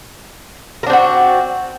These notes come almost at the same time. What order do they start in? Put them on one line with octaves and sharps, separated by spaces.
A#4 D4 C4 F#4